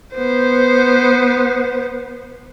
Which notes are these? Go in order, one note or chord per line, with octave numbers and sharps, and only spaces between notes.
B3 C5